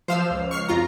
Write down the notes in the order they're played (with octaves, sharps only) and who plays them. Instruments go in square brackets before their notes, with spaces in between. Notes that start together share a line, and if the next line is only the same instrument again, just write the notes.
[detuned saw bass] F3 [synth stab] C5 F5 E6
[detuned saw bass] C#2
[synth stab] C#6 F6 C7
F2 F4 A#5